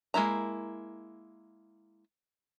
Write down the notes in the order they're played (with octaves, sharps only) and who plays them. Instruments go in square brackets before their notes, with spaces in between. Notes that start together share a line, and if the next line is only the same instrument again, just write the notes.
[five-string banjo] G#3 A#3 E4 A#5